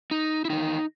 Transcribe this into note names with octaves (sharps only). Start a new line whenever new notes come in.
D#4
E4
E2 C3 D#3 D#4